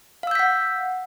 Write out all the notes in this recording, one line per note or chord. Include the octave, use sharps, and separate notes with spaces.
F5 F#5 E6 G6 B6